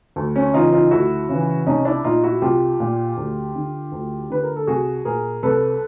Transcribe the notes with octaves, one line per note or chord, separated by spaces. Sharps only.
D2
C#4
C#3 E3 D#4 F4
D#4 F4
D2 E4 F#4
C#3 E3
C2 C#4 D#4
D4 E4
A#2 D#4 F4
E4 F#4
C2 F4 G4
A#2
D2
D3
D2
D3 B4
A#4
A4
C2 F#4 G#4
A#2 G#4 A#4
C2 A4 B4